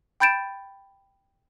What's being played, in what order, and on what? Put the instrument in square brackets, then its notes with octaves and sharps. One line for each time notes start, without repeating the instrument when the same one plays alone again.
[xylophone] G5 B5 G6 A6 D7 E7